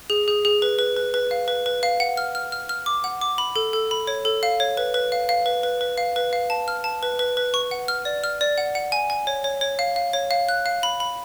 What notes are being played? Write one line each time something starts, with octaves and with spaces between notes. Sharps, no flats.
G#4
G#4
G#4
B4
B4
B4
B4
F5
B4
B4
F5
F#5
F6
F6
F6
F6
D6
F#5
D6
B5
A4
A4
B5
C#5
A4
F5
C#5
B4
B4
F5
F5
B4
B4
B4
F5
B4
F5
A5
F6
A5
B4
B4
B4
C#6
F#5
F6
D5
F6
D5
F#5
F#5
G#5
G#5
C#5
C#5
C#5
F5
F5
C#5
F5
F#6
F5
B5
B5